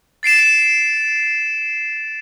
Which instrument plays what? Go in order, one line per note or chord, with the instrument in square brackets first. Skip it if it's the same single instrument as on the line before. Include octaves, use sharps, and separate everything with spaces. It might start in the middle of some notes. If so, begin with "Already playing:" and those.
[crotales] A6 C7 D7 E7